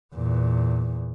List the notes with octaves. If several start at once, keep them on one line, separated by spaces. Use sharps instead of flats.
E2 A#2